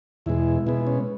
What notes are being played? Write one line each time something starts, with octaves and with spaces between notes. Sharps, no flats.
E2 B2 G#3 E4
B2 G#3 B3 E4
C#4